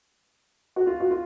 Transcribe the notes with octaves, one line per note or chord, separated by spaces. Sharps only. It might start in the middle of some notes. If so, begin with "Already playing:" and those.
F#4
F4
F#4
F4